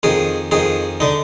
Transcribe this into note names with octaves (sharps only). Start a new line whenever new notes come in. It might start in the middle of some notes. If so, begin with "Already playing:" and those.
F2 D#3 G#4
F2 D#3 G#4
D3 D#4